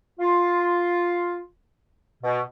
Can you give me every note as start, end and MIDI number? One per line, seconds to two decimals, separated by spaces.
0.19 1.42 65
2.23 2.40 47